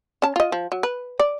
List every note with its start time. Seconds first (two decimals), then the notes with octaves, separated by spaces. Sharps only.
0.22 C#4 A5
0.36 F4 D#5
0.52 F3
0.72 F#3
0.83 B4
1.20 D5